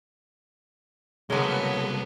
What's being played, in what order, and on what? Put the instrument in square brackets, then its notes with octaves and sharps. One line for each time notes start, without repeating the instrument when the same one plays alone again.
[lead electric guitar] C2 A4 [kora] C#3 A#3 [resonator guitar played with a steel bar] F#3 G#3 [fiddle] B3